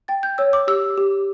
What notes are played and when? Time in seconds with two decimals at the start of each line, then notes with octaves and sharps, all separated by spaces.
0.08 G5 A6
0.23 G6
0.38 C#5 E6
0.53 D6
0.67 G4 E6
0.98 G4